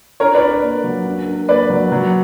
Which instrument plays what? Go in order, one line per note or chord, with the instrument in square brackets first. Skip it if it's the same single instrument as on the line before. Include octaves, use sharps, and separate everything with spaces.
[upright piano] D4 [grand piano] A#4 C#5
[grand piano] B4 D5
[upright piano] A#4
A#3
F#3
D4
A#4
[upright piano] A#3 [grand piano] B4 D5
[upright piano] F#3
F#3